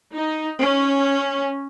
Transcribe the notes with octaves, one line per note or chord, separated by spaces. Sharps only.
D#4
C#4